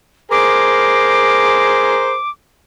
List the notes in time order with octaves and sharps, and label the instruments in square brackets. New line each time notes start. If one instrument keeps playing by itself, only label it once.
[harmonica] G#4 A#4 C5 [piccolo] D6